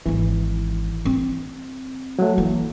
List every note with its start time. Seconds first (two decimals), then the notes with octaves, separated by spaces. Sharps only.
0.06 G#1 D#3 E3
1.05 C4
2.19 F#3 A3
2.38 E3 A#3